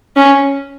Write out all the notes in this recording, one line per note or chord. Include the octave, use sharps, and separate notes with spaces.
C#4